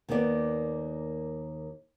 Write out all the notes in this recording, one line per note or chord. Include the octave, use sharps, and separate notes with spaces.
D#2 A#3 B3 D#4 D5